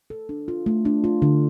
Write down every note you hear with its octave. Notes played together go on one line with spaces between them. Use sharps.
A4
D4
F4
A3
D4
F4
D3